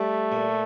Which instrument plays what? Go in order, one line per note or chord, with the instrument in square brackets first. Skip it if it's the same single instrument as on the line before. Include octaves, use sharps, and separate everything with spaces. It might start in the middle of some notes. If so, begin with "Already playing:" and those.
Already playing: [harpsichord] G3 [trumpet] A3
[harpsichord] A#2